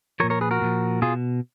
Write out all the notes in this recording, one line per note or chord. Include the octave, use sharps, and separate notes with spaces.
A#2 F3 A#4 C#5
A#4 C#5
G#4 B4
F#4 A#4
A#2 F3
B2 F4 G#4